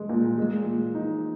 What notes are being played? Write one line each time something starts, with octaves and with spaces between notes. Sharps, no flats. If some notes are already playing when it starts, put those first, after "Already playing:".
Already playing: G#3
A#2
G#3
A#2
D#4